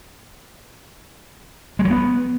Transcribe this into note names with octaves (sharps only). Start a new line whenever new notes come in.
G#3
F#3
B3